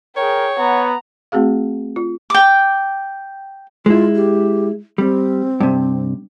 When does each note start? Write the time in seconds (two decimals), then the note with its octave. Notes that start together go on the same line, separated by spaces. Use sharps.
0.17 G#4 A#4 C#5 G5
0.59 B3 F#5 A#5
1.32 A3 C4 F#4 G#4 F5
1.96 F4
2.30 G5 D6
3.86 G#3 E4 F4
4.15 G4
4.98 G3 C4
5.60 G2 C3